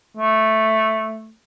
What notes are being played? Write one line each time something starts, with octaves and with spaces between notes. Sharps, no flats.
A3